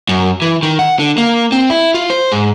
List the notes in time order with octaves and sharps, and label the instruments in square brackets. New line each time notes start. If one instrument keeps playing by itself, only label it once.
[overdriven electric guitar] F#2
E3
D#3
F#5
D3
A#3
C4
E4
F4
C5
G#2